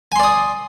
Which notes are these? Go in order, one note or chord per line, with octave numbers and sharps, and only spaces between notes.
D5 G#5 C6 D#6